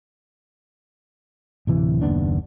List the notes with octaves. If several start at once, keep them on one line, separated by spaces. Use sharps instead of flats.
D1 C3 E3
F#1 D#2 B3 D4